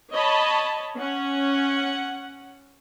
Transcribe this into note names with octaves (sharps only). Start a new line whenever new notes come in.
C#5 D#5 A5 B5
C#4 F#5